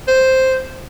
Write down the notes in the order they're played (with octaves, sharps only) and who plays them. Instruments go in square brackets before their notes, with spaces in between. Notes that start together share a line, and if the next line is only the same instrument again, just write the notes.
[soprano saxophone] C5